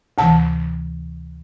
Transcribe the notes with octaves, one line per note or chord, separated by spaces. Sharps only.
D2 C3 E3 A5